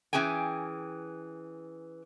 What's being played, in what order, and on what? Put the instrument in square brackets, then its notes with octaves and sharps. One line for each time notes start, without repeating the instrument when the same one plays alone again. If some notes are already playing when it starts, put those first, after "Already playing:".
[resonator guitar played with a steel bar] E3 C#4 G#4 G5 G#5